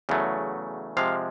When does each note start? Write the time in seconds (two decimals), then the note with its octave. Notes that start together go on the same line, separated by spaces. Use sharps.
0.09 E2 C#3 F#3 A3
0.97 C3 F3 G#3 F5